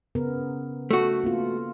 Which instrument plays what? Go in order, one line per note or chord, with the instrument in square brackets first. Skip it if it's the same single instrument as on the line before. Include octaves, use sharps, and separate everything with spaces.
[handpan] C#3 B3 A#4
[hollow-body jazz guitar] A3 F#4 [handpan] A4
[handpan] A#3 B3 F4